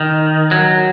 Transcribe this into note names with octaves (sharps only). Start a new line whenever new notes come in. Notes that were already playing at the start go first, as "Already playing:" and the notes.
Already playing: D#3
F#3